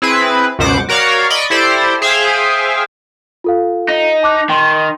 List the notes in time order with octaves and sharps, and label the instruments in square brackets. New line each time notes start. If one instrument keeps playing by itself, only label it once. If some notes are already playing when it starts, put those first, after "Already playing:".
[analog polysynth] C4 E4 G#4 B4
C#2 F#2 B2 C5 F#5 D6
F#4 A#4 C#5 D5 F5
D5 D#5 B5 C#6
E4 G4 A4 C5 D5
G#4 C5 E5 F5 G5 G#5
[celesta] F4 A4 F5
[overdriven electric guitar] D#4
[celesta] A5 D6 F#6
[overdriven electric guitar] D#3 [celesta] G5 C6